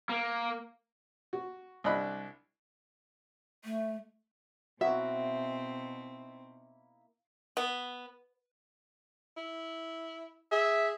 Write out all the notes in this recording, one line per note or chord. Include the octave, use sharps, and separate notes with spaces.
A#3
F#4
C2 D4 D#5 B5 F#6
A3
B2 A#3 C4 D#4 E4 F#4 E5
B3
E4
G#4 E5